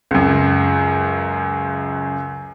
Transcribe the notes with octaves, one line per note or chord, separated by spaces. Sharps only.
C#2 F#2